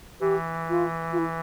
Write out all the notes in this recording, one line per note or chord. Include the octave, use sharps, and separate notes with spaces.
E3 G4
F4
F4
E4